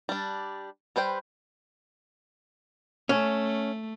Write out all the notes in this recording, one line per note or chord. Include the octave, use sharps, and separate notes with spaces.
G3 D4
G3 B4 C5 G5
A3 C#4